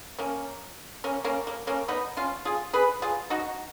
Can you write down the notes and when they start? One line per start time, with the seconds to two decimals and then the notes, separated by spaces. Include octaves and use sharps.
0.19 A#3 C#4
1.04 A#3 C#4
1.24 A#3 C#4
1.47 A#3
1.67 A#3 C#4
1.88 B3 D#4
2.17 C#4 F4
2.45 F4 G#4
2.73 G#4 B4
3.02 F4 G#4
3.30 D#4 F#4